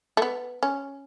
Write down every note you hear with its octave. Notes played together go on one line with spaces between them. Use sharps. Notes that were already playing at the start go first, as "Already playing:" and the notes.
A3
B3
C#4